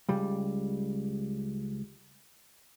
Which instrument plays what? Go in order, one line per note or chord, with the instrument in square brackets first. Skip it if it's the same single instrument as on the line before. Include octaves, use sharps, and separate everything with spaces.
[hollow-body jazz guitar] C#2 G3